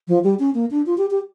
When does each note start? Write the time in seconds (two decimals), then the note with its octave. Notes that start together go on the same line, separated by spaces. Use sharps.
0.08 F3
0.24 G3
0.39 C#4
0.55 A#3
0.71 D4
0.86 F4
0.98 G4
1.11 G4